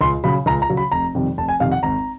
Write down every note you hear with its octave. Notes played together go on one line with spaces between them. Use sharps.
C#2 C6
C#3 F#3 B5
C#2 A#5
A#5
C#3 F#3
B5
F1 A#5
F2 C3 D#3 G3
F1 A5
G#5
F2 C3 D#3 G3 F5
F#5
G#1 A#5